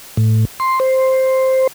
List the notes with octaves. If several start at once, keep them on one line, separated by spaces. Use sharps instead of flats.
A2
C6
C5